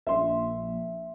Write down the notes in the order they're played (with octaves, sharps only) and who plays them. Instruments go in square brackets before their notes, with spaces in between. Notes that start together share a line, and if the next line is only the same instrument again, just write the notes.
[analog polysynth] A#1 [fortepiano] E5 C6